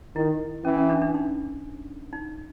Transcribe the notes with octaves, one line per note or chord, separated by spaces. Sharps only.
D#3 E4
E3 C#4
C#4
D4
D4
D#4
D#4